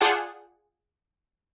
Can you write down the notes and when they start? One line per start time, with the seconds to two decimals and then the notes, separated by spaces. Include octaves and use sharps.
0.01 F4 G#4 D5 F#5 G5 A5